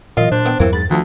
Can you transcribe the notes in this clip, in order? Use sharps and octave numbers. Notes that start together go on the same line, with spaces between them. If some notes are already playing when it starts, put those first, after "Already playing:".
F#2 A#2 E3 F4 D#5
A#2 D4 C5
B3 E5 G5
E2 G2 E3 F#3 A#3 C4
G#2 B5 A6
D2 D#3 F3